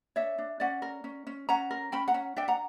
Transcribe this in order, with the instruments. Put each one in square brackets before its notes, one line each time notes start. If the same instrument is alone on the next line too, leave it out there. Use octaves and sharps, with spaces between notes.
[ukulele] D4 C#5 E5
D4
C#4 D5 F#5
A#4
C#4
C#4
C#4 F#5 A#5
A#4
C#4 G5 B5
F#5 A#5
C#4
D4 E5 G5
F#5 A#5